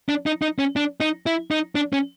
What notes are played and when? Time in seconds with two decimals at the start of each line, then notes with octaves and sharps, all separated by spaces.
0.09 D4
0.26 D#4
0.42 D#4
0.59 C#4
0.76 D4
1.00 D#4
1.26 E4
1.51 D#4
1.75 D4
1.93 C#4